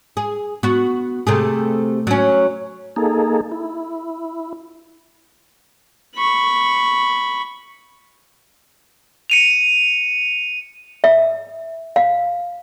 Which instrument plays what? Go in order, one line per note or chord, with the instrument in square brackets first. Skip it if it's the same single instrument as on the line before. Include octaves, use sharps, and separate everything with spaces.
[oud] G#4
B3 F#4
C3 A3 G#4
F#3 C#4
[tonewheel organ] A#3 D#4 G#4 A4
E4
[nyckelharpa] B5 C#6
[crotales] C#7 D#7 F7
[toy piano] E5
F5